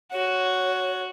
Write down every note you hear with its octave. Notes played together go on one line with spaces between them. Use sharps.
F#4 C#5